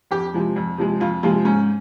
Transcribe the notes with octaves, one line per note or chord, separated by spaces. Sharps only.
F2 G4
C3 F3 G#3
F2
C3 F3 G#3
F2 F4
C3 F3 G#3 F4
G#2 C#4